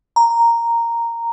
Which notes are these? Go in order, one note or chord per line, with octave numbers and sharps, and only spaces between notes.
A#5